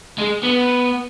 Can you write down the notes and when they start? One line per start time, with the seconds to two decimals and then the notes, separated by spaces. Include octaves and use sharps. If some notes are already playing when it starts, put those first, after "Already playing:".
0.18 G#3
0.43 B3